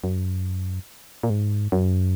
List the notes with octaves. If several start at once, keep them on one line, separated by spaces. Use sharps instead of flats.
F#2
A#2
G#2
F#2